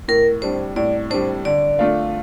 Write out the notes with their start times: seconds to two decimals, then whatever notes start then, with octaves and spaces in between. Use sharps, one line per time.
0.08 A2 A#4
0.42 G3 D4 C5
0.76 A2 D5
1.10 G3 D4 C5
1.45 D3 D5
1.79 A3 D4 F4